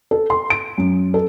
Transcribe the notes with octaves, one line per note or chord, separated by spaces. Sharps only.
A4
C6
D7
F#2
A4